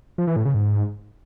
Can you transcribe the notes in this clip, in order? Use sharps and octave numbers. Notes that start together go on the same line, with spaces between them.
F3
E3
A2
C#3
G#2